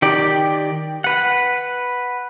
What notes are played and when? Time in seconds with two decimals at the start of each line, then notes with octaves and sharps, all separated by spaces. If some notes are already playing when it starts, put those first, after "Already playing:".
0.02 D#3 G4 D5
1.04 B4 F#5